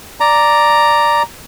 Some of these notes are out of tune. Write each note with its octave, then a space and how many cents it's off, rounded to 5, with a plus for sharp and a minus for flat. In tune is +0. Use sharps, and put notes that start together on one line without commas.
D5 +0 A#5 +0